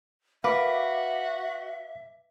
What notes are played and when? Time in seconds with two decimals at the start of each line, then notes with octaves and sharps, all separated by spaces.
0.44 F#4 B4 E5 F5 D6